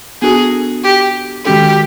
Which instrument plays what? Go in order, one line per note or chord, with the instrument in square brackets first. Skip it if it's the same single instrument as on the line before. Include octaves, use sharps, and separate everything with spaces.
[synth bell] B3 D4 F#4 A4 [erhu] G#4
[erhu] G4
[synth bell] D#3 G#3 C#4 F#4 A4 [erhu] G4